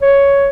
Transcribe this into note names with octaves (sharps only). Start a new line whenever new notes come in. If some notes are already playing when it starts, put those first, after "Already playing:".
C#5